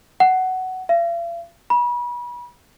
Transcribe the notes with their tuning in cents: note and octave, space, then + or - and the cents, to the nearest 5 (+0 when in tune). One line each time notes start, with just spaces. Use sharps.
F#5 +10
F5 -45
B5 -35